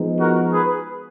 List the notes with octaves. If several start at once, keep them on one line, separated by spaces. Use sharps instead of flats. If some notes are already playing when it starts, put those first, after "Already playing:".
Already playing: F3 G#3 B3 D#4
F#4 A#4
G#4 B4